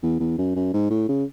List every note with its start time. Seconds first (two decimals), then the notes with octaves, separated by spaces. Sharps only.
0.03 E2
0.20 E2
0.38 F#2
0.56 F#2
0.74 G#2
0.90 A2
1.09 C#3